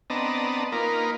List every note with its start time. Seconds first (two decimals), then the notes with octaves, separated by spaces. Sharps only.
0.10 B3 C4 D4 D#5 A5 A#5
0.72 A#3 D#4 F4 A#4 B4